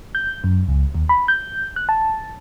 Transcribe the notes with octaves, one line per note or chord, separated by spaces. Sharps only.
G6
F#2
C#2
D#2
B5
G6
F#6
A5